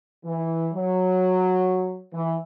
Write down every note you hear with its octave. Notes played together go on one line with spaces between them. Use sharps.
E3
F#3
E3